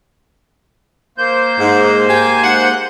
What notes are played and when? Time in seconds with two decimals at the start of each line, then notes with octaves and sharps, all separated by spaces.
1.18 A#3 C5 G6
1.59 G#2
2.08 G4 G#5
2.43 G#3 D#4 F#5